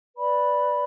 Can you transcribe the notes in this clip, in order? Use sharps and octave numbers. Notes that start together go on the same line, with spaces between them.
B4 D5 B5